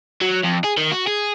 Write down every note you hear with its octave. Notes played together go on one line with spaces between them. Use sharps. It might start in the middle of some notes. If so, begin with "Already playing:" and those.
F#3
F2
G#4
D#3
F#4
G#4